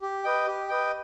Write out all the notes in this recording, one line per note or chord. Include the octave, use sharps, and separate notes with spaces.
G4
B4 D#5 G5
G4
B4 D#5 G5